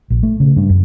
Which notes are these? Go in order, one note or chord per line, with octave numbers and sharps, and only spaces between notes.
A#1
A3
C#3
G2
F#2